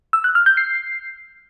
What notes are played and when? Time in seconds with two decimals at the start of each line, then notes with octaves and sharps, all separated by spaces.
0.13 E6
0.24 F#6
0.35 F6
0.46 G6
0.57 C7